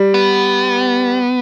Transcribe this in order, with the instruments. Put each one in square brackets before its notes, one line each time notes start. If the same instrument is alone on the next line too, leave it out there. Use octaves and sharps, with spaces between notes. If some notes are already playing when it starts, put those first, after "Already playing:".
Already playing: [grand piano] G3
[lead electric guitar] B3